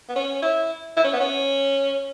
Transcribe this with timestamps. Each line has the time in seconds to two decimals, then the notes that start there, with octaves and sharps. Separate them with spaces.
0.09 B3
0.16 C#4
0.42 E4
0.97 E4
1.04 C#4
1.13 B3
1.20 C#4